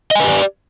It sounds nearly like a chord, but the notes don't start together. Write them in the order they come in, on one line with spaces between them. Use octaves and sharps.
D#5 G#5 B4 G4 D5